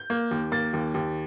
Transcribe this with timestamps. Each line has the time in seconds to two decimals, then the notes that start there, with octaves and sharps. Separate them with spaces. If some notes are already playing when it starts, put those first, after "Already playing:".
Already playing: G6
0.10 A#3
0.31 D#2
0.52 A#3 A6
0.73 D#2
0.94 D#2